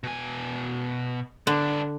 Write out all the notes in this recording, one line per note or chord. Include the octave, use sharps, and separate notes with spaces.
B2 G#5
D3 B3 D4